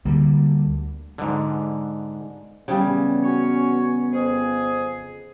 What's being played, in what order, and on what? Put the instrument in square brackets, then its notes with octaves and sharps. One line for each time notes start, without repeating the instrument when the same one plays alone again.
[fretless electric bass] D2 D3 G3 A#3
[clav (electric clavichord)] G#2 D3
[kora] C#3 E3 G3 [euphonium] B3
[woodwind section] C#4 F#4 C#5
F2 G#4